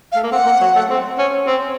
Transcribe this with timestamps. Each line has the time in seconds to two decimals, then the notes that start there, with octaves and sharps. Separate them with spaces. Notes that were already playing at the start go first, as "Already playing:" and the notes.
0.12 F5
0.15 A3
0.23 A#3
0.31 C4 F#5
0.46 A#3
0.61 F#3
0.75 A3
0.90 C4
1.18 C#4
1.47 C4